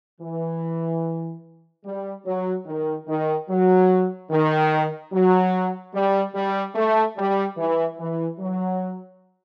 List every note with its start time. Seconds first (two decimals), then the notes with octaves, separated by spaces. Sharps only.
0.21 E3
1.85 G3
2.26 F#3
2.67 D#3
3.08 D#3
3.49 F#3
4.31 D#3
5.13 F#3
5.95 G3
6.35 G3
6.75 A3
7.18 G3
7.57 E3
7.99 E3
8.40 F#3